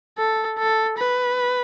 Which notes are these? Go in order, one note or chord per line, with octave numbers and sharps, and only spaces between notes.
A4
A4
B4